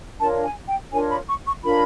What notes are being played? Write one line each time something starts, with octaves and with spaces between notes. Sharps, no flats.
D4 F4 A#4 C#5 A5
G#5
G5
D4 F4 A#4 C#5 G#5
B5
C#6
C#6
D4 F4 A#4 C#5 B5